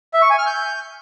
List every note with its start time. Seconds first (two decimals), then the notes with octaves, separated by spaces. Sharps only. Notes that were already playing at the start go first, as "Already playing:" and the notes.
0.14 E5
0.22 C#6
0.30 G#5
0.38 F6
0.47 G6